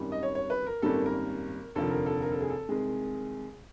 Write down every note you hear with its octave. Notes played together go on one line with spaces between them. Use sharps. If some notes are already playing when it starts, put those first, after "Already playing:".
Already playing: G#1 F#2 D#3 G3
D#5
C#5
C#5
B4
A#4
G#1 F#2 D#3 G3 A#3 A4
A#4
F1 D#2 D3 F3 A#3 A4
A#4
A4
A#4
A4
G#4
A4
C2 C3 D#3 G#3 G#4